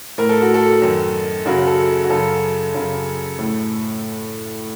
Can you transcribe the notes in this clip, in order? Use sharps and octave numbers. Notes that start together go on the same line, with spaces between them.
A2 A#4
A4
F#4
A4
F#2 D#3
F#2 C#3 F#4
A4
F#4
F#2 C#3 A4
F#2 C#3
A2